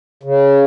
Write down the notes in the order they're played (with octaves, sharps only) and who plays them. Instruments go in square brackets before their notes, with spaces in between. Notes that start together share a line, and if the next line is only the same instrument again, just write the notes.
[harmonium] C#3